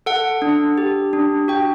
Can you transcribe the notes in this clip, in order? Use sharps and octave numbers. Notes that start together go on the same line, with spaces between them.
A4 F#5
D4
G4
D4
F#4 G5